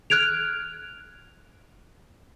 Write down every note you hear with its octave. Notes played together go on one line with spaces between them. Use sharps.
F6 F#6 G#6 D7 F7